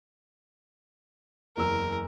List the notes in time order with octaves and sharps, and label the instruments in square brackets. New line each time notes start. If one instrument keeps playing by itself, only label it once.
[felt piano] F#1 E2 E6 [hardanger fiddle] A#4